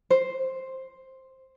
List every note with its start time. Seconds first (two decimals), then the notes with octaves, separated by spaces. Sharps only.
0.10 C5